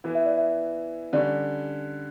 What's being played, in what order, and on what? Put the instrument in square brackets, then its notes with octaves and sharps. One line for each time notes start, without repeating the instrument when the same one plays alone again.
[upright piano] E3 B3 E4
[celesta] E5
D5
E5
[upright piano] D3 G3 C#4 [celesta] D5